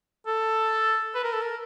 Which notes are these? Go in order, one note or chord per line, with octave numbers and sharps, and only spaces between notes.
A4
B4
A#4
A4
A#4